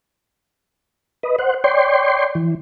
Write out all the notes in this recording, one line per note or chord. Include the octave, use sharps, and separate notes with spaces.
B4 D#5
C5 F#5
C#5 D5 G5 C6
E3